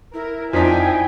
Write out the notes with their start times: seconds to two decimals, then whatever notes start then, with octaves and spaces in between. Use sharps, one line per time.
0.14 E4 A#4
0.53 F2 F3 D4 D#4 D#5 G5 G#5 B6